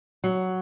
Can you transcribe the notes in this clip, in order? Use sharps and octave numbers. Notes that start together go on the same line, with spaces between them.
F#3